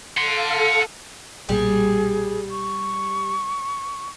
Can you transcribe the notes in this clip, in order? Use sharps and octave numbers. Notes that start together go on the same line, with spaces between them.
A4 F5 F#5 C6
B1 A#2 G3 G#4
C#6